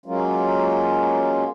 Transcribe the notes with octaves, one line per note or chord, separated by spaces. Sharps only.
F#3 G#3 A#3 C#4 F4